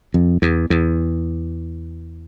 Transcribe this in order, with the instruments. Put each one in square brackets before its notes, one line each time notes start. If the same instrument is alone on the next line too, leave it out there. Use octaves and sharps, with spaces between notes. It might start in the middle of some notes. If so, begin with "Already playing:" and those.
[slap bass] F2
E2
E2